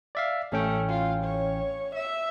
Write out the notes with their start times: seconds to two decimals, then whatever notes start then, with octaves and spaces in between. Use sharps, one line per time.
0.15 D5 E5 F5
0.52 A1 A3 C#4 G5
0.88 F4
1.24 C#5
1.95 E5